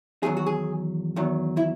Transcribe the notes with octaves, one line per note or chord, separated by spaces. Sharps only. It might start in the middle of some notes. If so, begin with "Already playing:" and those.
E2 D#3 F#3 G#4
F#4
G#4
E2 D#3 F#3
E4